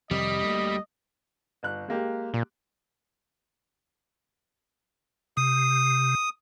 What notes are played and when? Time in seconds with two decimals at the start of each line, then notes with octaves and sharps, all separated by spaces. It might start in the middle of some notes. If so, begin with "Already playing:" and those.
0.11 F2 C3 D#3 G3 D#5
0.42 D2 A3 A#3
1.63 G1 F#6
1.88 G#3 A#3 G4
2.34 A#2
5.37 C3 D#6